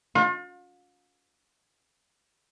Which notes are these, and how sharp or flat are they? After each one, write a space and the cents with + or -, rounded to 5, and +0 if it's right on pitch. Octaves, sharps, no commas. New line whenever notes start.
F4 +40